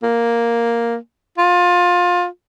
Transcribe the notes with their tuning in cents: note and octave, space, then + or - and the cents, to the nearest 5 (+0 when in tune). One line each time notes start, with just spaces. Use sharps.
A#3 +0
F4 +25